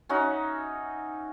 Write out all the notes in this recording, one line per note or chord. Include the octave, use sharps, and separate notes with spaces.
C#4 D#4 F#4 E5